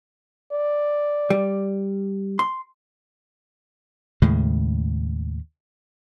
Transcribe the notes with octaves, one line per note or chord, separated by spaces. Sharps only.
D5
G3
C6
D#2 A2 C#3 G#3